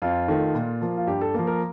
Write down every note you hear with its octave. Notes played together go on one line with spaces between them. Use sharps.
F2 F4
D#3 A3
A#2
F3 A#3
F4
G2 G4
A4
F3 A#3
A#4